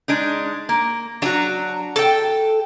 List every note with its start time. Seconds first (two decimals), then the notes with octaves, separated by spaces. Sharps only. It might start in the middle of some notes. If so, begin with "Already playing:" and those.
0.08 G#3 D4 D#4
0.69 A#3
1.22 F#3 D4 F#4 A#5
1.96 A4 G5